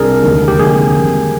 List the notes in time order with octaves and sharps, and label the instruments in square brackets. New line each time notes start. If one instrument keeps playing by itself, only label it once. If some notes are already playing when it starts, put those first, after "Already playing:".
Already playing: [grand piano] C2 G3 D4 [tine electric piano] G#4 A#4
[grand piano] F1 D#2 D3 G#3
[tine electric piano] G4
[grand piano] F1 D#2 D3 G#3 [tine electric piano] G#4
[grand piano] G#1 G#2 G3